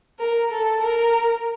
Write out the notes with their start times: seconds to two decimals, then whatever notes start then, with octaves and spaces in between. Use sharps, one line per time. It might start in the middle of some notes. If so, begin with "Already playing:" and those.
0.19 A#4
0.51 A4
0.82 A#4